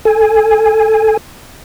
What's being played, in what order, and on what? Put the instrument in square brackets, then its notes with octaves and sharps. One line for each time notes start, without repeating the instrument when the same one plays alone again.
[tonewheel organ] A4 G#5